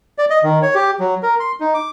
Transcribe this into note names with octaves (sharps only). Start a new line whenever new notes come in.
D5
D#5
D#3
C#5
G4
F#3
A#4
C6
D#4
D6